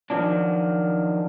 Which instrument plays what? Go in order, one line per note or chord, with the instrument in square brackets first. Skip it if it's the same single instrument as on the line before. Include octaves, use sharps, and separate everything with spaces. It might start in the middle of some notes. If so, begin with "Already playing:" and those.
[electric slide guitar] D#3 F3 F#3 D4